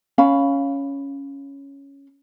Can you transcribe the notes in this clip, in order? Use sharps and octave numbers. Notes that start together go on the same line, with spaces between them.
C#4 F5 B5